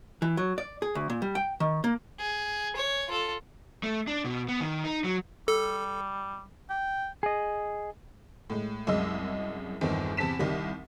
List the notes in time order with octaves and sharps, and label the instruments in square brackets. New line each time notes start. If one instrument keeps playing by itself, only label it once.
[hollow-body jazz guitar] E3
F#3
D5
G#4
D2
A#2
G3
G5
D#3
A#3
[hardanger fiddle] G#4
C#5
F4 A4
[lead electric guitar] A3
D4
B2
B3
D#3
D#4
F#3
[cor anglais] G3 [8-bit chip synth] A4
[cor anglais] G5
[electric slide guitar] G#4 D#5
[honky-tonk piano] A2 G#3
C2 F#2 G#3 D#5 E6
G1 E2 D#3 C4
E2 C3 A5 B6 E7
C2 D#3 G3